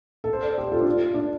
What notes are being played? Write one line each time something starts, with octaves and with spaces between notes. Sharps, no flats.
A4
C5
A4 D5
G4 C5
F4 A4
D4
F4
D4